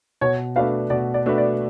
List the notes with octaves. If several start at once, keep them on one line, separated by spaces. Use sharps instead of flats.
B2 C#5
A3 D4 F#4 B4 F5
B2 D5
D5
A3 D4 F#4 B4
D5